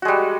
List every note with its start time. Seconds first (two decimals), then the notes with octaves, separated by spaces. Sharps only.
0.02 F#4
0.05 G#3
0.08 G3